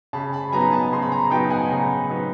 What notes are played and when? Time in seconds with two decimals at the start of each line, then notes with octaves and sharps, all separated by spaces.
0.13 C#3 A5 B5
0.33 A5 B5
0.52 F#3 B3 D#4 G#5 A#5
0.72 A5 B5
0.92 C#3 C6
1.02 B5
1.12 G#5 A#5
1.31 F#3 B3 D#4 G5 A5
1.50 F#5 G#5
1.66 B5
1.70 C#3 G#5 A#5
2.09 F#3 B3 D#4